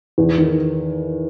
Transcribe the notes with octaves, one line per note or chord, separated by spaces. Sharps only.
E2
D#3